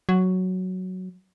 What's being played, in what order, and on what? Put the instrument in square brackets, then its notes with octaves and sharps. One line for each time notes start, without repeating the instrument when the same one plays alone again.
[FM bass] F#3